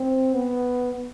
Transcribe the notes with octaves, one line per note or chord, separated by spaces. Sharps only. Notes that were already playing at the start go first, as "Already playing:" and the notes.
Already playing: C4
B3